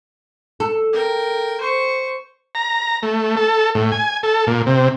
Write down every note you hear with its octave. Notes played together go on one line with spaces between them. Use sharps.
A4
A#4 G5
C5 C#6
A#5
A3
A4
A2
G#5
A4
A#2
C3